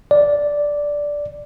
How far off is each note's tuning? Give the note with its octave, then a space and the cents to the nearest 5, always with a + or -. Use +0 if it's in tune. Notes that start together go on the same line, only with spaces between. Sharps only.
D5 -5